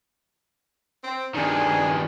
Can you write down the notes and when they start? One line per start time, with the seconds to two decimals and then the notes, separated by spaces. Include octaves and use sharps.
1.03 C4
1.35 G2 D#3 D4 G#4 G#5